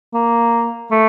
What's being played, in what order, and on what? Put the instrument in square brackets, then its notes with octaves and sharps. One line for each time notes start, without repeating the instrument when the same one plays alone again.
[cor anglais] A#3
A3